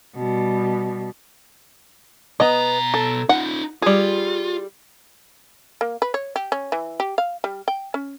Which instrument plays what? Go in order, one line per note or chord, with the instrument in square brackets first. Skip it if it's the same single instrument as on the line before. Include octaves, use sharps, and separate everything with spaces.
[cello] B2 G3
[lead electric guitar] B2 A#5 [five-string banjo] B3 D#5
[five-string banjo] A4
[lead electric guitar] D#4 F4 [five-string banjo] F#5
[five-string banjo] G3 G#4 [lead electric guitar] F4
[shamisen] A#3
B4
C#5
G4
C#4
E3
G4
F5
G3
G5
C#4